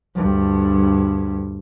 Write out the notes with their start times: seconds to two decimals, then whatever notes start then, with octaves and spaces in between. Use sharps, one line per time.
0.16 D2 G2